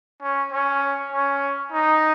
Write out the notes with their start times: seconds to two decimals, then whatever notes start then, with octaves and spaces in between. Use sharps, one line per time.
0.22 C#4
0.52 C#4
1.13 C#4
1.72 D#4